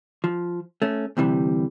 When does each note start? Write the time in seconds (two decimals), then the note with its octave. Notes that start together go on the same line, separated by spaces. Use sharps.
0.24 F3
0.82 A3 C#4
1.17 D2 C3 E3 G3